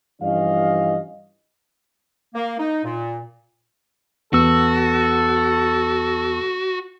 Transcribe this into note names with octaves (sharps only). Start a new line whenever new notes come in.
G2 E3 F3 C#4 D#5 F5
A#3
D#4
A#2
E2 B3 F#4 A4 E6